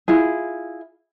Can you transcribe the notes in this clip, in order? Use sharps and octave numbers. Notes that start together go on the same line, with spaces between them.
E4 F4 G#4